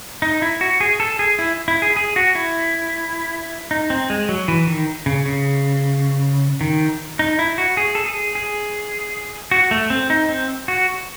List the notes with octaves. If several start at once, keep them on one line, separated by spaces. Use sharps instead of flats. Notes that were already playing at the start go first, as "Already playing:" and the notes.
D#4
E4
F#4
G#4
A4
G#4
E4
E4
G#4
G#4
F#4
E4
D#4
C4
G#3
F#3
E3
D#3
C#3
C#3
D#3
D#4
E4
F#4
G#4
A4
G#4
G#4
F#4
A3
C4
D#4
C4
F#4